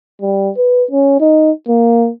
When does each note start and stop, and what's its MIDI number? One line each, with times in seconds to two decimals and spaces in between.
0.22 0.50 55
0.57 0.84 71
0.91 1.18 61
1.20 1.51 63
1.68 2.10 58